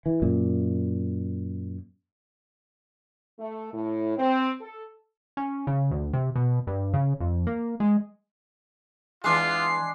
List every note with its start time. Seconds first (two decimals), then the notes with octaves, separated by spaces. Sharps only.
0.06 E3
0.22 F#2 A#2
3.40 A3
3.73 A2
4.18 C4
4.61 A4
5.37 C#4
5.67 C#3
5.91 D2
6.13 C3
6.36 B2
6.67 G2
6.94 C#3
7.20 F2
7.47 A#3
7.80 G#3
9.24 E2 G#3 D4 F4 E5 A5 C7